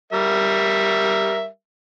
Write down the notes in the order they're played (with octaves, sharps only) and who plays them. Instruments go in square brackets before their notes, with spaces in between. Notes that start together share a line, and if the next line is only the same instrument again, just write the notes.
[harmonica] G3 A#4 E5